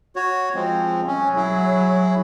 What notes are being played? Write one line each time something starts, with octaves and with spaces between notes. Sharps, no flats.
F#4 C#5
F3 G#3 C4
F#3 C#4
E4 G#4